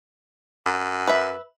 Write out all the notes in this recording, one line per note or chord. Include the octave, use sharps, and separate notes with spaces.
F#2
B4 E5